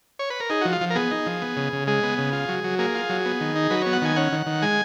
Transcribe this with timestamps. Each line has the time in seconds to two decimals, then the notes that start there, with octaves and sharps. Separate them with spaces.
0.19 C#5
0.30 B4
0.40 A#4
0.50 D#4 G#4
0.61 F3 F#4
0.73 F4
0.81 F3
0.90 A#4
0.95 B3 G#4
1.11 D#4
1.26 F3
1.42 B3
1.57 C#3
1.73 C#3
1.87 G#3 G#4
2.03 B3
2.18 C#3
2.33 F4
2.49 F#3
2.64 F#3
2.79 A#3 G#4
2.95 F4
3.09 F#3
3.25 B3
3.41 D#3
3.56 D#4
3.70 F#3 B4
3.82 B3 C#5
3.93 F#5
4.02 D#3 G#5
4.16 C#4 F#5
4.32 D#3
4.46 D#3
4.62 G#3 G#5